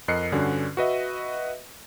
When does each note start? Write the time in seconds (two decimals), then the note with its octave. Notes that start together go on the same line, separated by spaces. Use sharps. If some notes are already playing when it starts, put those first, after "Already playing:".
0.08 F2 A#4 D#5 F#6 C7 C#7
0.32 G2 D3 C#4 F#4
0.77 F#4 B4 D#5 E5